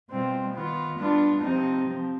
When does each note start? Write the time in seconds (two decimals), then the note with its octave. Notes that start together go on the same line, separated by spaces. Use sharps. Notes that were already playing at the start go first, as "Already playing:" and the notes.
0.09 B2 G3 C4 F4
0.53 D#3 B3 F4
0.97 G3 B3 D4 F4
1.41 C3 F3 C4 D#4
1.86 F3 C4